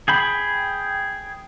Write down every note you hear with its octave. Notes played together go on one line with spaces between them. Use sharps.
G#4 G5 B5